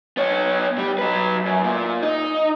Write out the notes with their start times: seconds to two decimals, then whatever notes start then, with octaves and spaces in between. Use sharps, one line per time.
0.17 B3 C#5
0.78 G3
0.99 F#3 B4
1.46 F#2
1.64 A#2
2.02 D#4